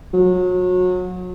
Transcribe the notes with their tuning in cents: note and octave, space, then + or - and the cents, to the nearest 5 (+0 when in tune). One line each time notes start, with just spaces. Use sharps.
F#3 -30